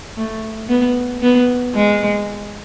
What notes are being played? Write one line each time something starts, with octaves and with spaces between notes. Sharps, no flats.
A3
B3
B3
G#3